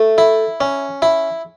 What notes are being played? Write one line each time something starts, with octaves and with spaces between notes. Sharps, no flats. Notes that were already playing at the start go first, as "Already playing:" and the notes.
Already playing: A3
E4
C#4
E4